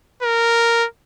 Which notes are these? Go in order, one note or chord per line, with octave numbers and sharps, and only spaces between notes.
A#4